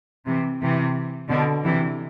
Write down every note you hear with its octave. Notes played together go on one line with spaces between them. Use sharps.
C3 E3
C3 E3
B2 D3
C3 E3